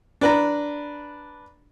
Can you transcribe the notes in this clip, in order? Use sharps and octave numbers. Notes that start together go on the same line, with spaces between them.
D4 B4 A#5